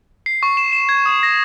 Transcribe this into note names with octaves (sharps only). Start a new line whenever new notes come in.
C7
C#6
E7
E7
G#6
D#6
A#6